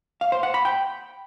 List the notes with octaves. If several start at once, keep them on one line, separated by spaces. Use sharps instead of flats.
F5
C5
F#5
B5
G5